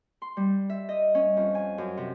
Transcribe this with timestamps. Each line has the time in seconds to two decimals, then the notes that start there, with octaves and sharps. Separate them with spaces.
0.22 C6
0.37 G3
0.69 E5
0.89 D#5
1.15 C#4
1.37 F2
1.55 G#5
1.78 F#2
1.97 C3